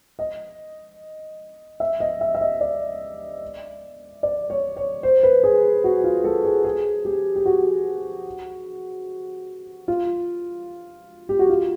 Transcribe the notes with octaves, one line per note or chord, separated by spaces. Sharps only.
D#5
E5
D#5
E5
E5
D#5
D5
D5
C#5
C#5
C5
B4
G#4
F#4
F4
A4
G#4
G#4
G4
G4
F#4
F4
G4
F#4
F4